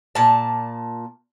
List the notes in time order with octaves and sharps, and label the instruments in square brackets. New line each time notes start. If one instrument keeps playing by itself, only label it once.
[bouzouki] A#2 A5